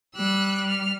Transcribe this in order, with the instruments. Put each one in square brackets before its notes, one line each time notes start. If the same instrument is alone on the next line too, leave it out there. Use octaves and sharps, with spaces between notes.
[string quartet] G3 [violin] E6 F#6
[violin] F6